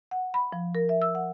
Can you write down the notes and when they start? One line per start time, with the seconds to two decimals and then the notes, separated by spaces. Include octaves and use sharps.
0.11 F#5
0.34 B5
0.52 F3
0.75 A#4
0.89 E5
1.02 E6
1.15 F#5